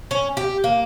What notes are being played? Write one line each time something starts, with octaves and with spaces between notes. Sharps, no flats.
C#4
G4
A#3